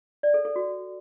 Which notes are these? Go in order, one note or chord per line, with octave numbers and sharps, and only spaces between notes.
D5
A4
A4
F#4